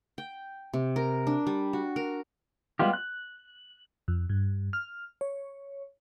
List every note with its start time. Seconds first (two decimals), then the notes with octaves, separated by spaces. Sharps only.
0.18 G5
0.73 C3
0.96 A#4
1.27 D4
1.47 G3
1.73 F#4
1.96 A#4
2.79 G3 G#3 B3 F4 G4
2.93 F#6
4.08 F2
4.30 G2
4.73 F6
5.21 C#5